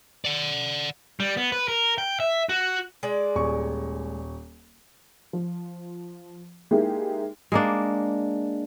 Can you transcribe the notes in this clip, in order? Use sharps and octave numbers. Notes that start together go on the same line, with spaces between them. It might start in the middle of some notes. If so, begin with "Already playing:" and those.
D5 F#5
G3
B3
B4
A#4
G5
E5
F#4
G#3 D5
D#1 C#6
F3
G#3 A#3 D#4 E4 G4
G#3 A#3 D4